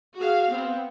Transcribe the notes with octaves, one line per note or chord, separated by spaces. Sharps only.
F#4 G#4 F5
B3 C4